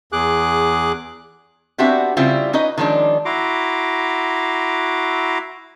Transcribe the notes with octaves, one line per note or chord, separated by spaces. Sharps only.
E2 G#4 D6 F#6
B3 C4 D4 F#4 G4 E5
C#3 G3 C4 E4 F4
C#4 D#4 B4 D#5
D#3 F3 G#3 C#4 D4
E4 F#4 A#5 C6 D6